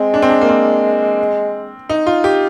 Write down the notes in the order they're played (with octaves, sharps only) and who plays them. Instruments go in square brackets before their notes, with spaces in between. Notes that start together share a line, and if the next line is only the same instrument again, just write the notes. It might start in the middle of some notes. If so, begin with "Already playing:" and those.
Already playing: [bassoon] G#3 [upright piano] C4
[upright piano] D4
C4
D4
A#3
C4
D#4
F4
G4